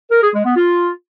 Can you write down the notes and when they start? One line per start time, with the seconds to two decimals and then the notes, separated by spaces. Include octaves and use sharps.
0.11 A#4
0.22 G#4
0.34 G#3
0.45 B3
0.56 F4